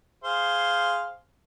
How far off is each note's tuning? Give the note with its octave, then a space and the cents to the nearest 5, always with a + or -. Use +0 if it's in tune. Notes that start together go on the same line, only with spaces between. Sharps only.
G#4 +0 C5 +0 F5 +0